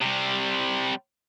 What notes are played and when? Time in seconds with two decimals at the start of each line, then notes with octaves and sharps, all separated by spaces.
0.01 C3 G3